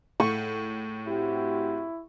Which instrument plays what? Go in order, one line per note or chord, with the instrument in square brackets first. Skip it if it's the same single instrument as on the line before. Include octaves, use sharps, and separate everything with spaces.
[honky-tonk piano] A2 [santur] C#6
[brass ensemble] C4 F#4 G4 [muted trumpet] E4